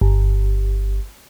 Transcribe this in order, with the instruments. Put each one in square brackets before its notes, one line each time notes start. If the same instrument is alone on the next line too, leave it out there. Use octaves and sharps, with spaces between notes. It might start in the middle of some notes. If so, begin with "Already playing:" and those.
[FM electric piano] G1